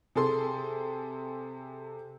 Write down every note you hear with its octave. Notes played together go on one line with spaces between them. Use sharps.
C3 G#4 A4 C6